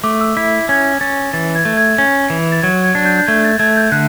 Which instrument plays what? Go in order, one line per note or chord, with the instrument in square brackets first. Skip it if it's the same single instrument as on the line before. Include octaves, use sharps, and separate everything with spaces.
[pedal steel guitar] A3 [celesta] D6
[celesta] E6
[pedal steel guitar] E4
[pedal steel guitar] C#4 [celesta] G#6
[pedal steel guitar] C#4 [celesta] A6
[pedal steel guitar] E3 [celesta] A6
[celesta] G#6
[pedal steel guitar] A3
[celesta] G#6
[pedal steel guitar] C#4 [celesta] G#6
[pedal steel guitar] E3
[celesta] A6
[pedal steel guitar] F#3 [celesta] G#6
[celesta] G#6
[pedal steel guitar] D4
[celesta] G6
G6
[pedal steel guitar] A3 [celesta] G#6
[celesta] A6
[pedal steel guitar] A3 [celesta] G#6
[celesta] G6
[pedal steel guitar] D3 [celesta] F#6